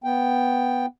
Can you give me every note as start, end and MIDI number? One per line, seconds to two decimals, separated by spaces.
0.04 0.86 59
0.04 0.86 79